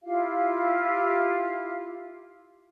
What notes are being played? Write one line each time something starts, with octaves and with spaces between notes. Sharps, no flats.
E4 F4 G4 F5